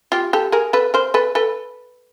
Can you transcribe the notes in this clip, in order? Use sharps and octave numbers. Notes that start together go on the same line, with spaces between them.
F4 G4
G4 A4
G#4 A#4
A4 B4
A#4 C5
A4 B4
A4 B4